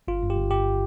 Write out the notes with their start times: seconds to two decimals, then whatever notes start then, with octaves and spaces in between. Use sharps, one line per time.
0.08 G1 F4
0.23 G2
0.30 G4
0.37 G1
0.51 G1 G4